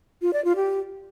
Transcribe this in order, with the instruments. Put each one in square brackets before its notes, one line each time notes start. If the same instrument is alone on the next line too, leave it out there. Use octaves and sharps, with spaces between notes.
[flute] F4
D5
F4
G4